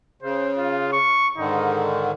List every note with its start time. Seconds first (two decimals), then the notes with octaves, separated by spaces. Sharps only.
0.22 C#3 C5
0.57 F4
0.93 C#6
1.37 G#2 D3 D#3 D#4